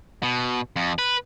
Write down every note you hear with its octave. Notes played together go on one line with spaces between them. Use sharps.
B2
F2
B4